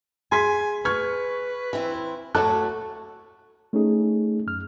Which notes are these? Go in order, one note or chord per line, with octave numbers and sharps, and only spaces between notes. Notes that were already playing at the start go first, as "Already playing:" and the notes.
G#4 G#5 C6 B6
B4 C#6 F6 G#6
E3 C4 E4
A2 A3 F#4 A4 C#5 A5 D6 F#6
A3 C#4 D#4 G#4
F#2 F6